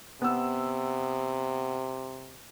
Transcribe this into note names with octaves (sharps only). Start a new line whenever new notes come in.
C3 B3 E6